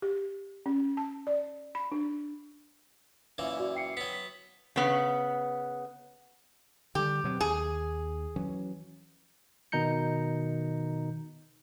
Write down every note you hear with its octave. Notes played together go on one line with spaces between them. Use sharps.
G4
C#4
A5
D5
B5
D4
F#2 A#2 E3
F#4 D5
G5 C7 C#7
F#3 B3 B6
B6
C#3 B3
D3 G3 G4
B2 F#3 C4
D#2 G#4
E3 F#3 C#4
B2 D#3 D#4 A#5 G6 C#7